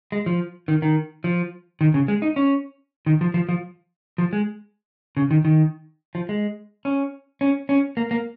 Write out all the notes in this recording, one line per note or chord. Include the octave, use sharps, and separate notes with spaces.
G#3
F3
D#3
D#3
F3
D#3
C#3
G#3
D#4
C#4
D#3
F3
F3
F3
F3
G#3
C#3
D#3
D#3
F3
G#3
C#4
C#4
C#4
A#3
A#3